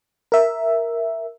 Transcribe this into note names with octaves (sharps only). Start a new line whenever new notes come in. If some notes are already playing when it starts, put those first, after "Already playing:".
A#4 E5